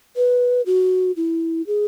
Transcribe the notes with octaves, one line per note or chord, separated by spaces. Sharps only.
B4
F#4
E4
G#4